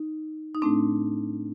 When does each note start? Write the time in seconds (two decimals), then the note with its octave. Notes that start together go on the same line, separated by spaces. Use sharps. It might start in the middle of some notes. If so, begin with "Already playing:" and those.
Already playing: D#4
0.55 D#4
0.62 A2 A3 C4 D4